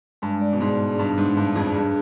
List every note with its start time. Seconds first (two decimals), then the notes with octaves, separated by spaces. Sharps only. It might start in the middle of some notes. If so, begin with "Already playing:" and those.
0.22 G2 G#3
0.41 D5
0.53 B2
0.61 G#2 G#4
0.80 D4
0.99 G2 D4
1.18 G#2 D4
1.36 G2 D5
1.56 F2 G#4
1.74 G2 D4